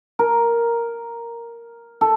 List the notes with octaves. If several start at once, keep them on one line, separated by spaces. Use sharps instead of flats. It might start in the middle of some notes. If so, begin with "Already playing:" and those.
A#4
A4